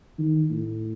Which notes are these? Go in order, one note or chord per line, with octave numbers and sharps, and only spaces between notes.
D#3
A2